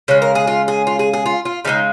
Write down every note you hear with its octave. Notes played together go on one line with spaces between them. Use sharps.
C#3 G#3 C#5
A#4
G#4
F4
G#4
F4
G#4
G#4
F4
F4
C#3 F3 G#3 D#4